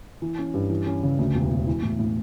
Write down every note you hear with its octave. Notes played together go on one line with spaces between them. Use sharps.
E3
C#4
G2
E3
C#4
C#3
D2
E1
E1
E3
A2
A2